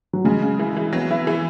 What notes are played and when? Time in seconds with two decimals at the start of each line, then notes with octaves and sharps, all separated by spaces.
0.13 F#3
0.25 C#3 G#3
0.42 C#3
0.59 E3
0.77 E3
0.93 F#3 B3
1.11 E4
1.27 E3